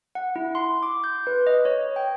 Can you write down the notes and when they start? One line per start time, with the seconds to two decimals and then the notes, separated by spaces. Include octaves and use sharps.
0.15 F#5
0.36 E4
0.55 C6
0.83 D6
1.04 G6
1.27 B4
1.47 D#5
1.65 C#5
1.96 G5